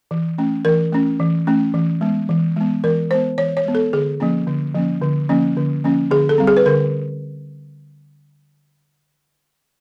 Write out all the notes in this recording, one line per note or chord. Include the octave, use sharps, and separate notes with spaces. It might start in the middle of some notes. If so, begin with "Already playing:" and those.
E3
A3 C#4
E3 A#4
A3 C#4
E3
A3 C#4
E3
G#3 B3
E3
G#3 B3
E3 A#4
G#3 B3 C5
E3 C#5
C#5
G#3 B3
A4
D3 G#4
F3 A#3 C#4
D3
F3 A#3 C#4
D3
F3 A#3 C#4
D3
F3 A#3 C#4
D3 G#4
A4
G3 C4
G#4
B4
D3 A#4